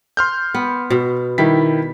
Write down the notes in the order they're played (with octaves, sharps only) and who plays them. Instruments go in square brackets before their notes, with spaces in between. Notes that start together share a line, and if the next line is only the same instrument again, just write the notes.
[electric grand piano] C6 F6 G6
[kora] B3
B2
[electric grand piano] D#3 E4 B6 [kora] G3